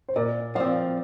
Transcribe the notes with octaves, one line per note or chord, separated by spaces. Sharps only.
C5
A#2 A#4 D5
F3 C4 D5 F5